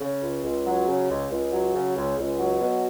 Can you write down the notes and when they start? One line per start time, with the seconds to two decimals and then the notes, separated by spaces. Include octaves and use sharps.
0.01 C#3
0.23 C#2
0.43 C#2
0.66 F#3
0.88 C#3
1.09 C#2
1.31 C#2
1.53 F#3
1.74 C#3
1.96 C#2
2.17 C#2
2.39 F#3
2.61 B2